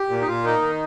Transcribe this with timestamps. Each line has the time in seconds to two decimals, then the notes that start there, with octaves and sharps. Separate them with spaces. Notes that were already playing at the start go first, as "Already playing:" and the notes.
Already playing: G4
0.09 A#2
0.21 D#4
0.27 A#2 F4
0.44 A#3 D#4
0.62 D#3